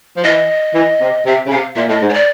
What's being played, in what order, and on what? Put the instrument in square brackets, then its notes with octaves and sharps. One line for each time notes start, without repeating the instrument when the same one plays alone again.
[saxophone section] F3
[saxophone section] E3 [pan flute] D#5
[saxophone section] E3
C3
[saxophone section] C3 [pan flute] E5
[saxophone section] C#3
[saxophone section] C3 [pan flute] F5
[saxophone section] A#2 [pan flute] E5
[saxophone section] A2 [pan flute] D#5
[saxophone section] G#2
[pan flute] C#5
D5